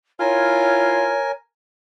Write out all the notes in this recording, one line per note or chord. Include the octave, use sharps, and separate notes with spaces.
E4 F4 A#4 C#5 G#5